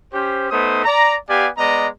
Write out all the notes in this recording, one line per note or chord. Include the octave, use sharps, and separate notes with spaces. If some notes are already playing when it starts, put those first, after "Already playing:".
C#4 G4 C5
A3 B3 D#4 C5 D#6
D5 A#5
B3 G4 D5 F5 G#5
G#3 B3 D5 D#5 A#5